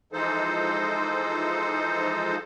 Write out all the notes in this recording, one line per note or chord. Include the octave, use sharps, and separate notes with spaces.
E3 F3 G#3 D#4 A4 C5